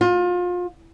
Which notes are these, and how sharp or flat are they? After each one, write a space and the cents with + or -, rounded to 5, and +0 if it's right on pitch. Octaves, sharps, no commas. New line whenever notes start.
F4 +30